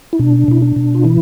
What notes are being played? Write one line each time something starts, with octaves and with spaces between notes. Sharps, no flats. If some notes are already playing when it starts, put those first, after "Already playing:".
E4
B2 D4
B2 E4
D4
B2
F4
E3 E4